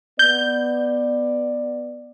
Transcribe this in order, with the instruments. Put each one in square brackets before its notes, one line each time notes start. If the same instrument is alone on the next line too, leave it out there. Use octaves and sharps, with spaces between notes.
[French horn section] B3 D5 [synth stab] G6